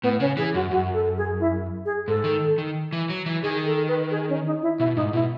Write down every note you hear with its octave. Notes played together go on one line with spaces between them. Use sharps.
A2 B3
C#3 C#4
E3 G#4
F#2 F#4
F#2 F#4
A4
G#4
E4
G#4
G#2 A4
D#3
D#3
E3
F#3
E3
D#3 G#4
A4
B4
G#4
C#4
D#4
E4
B2 E4
G#2 D#4
B2 E4